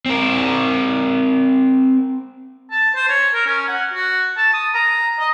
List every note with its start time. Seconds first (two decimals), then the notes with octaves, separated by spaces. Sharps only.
0.06 C4 A#4
2.71 A5
2.95 C5
3.09 C#5
3.34 A#4
3.46 C#4
3.68 F#5
3.93 F#4
4.37 A5
4.54 D#6
4.74 A#5
5.19 D#5